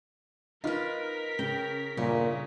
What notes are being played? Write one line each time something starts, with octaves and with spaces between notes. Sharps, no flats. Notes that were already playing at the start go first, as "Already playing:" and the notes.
D#4 F4 A#4 B4 F6 B6
C#3 G5
G1 A#2 C#3